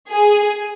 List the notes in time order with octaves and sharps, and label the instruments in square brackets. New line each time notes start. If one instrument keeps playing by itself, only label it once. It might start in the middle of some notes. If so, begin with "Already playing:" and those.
[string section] G#4